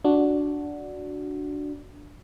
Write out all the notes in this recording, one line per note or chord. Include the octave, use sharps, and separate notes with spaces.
D4 F#4